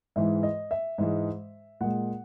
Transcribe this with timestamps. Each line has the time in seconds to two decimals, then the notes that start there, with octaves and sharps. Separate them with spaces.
0.16 G#2 E3 G#3 E5
0.43 D#5
0.71 E5
0.98 G#2 E3 G#3
1.81 A#2 G#3 F#5